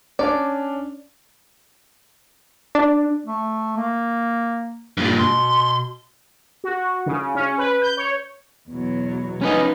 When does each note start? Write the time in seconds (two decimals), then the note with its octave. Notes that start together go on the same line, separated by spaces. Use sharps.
0.19 C#4 D4 D5
2.75 D4
3.26 A3
3.77 A#3
4.97 G2 A#2
5.19 B2 C6
6.64 F#4
7.06 C#3
7.35 C#4
7.58 B4
7.82 G6
7.97 C#5
8.70 E2 B2 F#3
9.41 F3 B3 C#4 D#4 B4 D#5